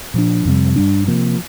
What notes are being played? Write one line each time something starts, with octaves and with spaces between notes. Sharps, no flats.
A#2 F3 D4
F2 C3 G3
G2 G3 D4
C3 F3 A#3